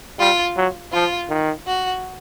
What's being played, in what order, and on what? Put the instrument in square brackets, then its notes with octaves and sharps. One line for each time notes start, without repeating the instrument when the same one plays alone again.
[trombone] G3 [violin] F4
[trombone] F#3
[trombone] F3 [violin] F4
[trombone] D#3
[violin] F#4